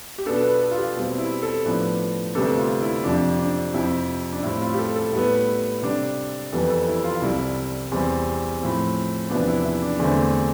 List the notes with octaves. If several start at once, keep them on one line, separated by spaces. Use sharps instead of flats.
G4
B2 B3 D4 A4
B4
A4
F4
G4
B2 G3 C4
E4
A4
A2 F3 B3 D4 B4
D2 C3 G3 B3 D4 A4
F4
E4
F2 C3 F3 D4
D4
F2 C3 F3 E4
D4
A2 G3 C4 E4
F4
G4
A4
A4
A2 G3 B3
C3 G3 D4
F2 E3 G3 B3 A4
A4
E4
F4
C2 C3 G3 E4
E2 C3 G3 C4
A2 F3 C4
E2 C3 F3 B3 D4
E4
E4
D4
E2 D3 A3 C4